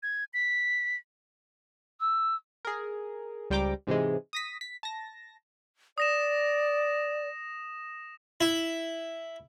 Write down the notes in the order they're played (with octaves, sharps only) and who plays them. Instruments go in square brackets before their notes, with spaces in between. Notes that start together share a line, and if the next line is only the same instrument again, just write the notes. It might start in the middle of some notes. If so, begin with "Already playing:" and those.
[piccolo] G#6
B6
[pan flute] E6
[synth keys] G#4 A#4
C#2 G3 C5 G5 A#5 D6
G#2 C3 E3 G#3
D#6 A#6 B6
B6
A5 A#6
[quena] D5 [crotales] D#6 A#6 E7
[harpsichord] E4